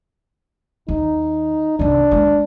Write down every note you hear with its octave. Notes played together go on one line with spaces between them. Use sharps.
D#2 D#4
C2 B3 D4
G#3 A#3